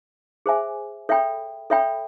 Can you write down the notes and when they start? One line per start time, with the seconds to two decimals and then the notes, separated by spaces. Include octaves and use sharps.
0.46 G#4 C5 E5 G#5
1.09 A4 C#5 E5 G5 B5
1.70 A4 C#5 E5 G5 B5